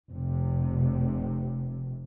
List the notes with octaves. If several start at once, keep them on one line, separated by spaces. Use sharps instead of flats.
F1 C3